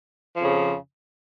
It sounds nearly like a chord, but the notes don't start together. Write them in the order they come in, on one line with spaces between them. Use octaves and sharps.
F3 F2 C#3